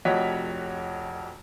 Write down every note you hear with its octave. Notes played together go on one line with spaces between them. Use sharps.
F1 F2 F#4 C#5 D#5 B6